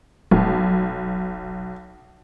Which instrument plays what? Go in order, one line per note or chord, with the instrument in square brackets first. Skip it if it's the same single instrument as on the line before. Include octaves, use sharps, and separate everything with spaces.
[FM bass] D#1 [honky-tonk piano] B1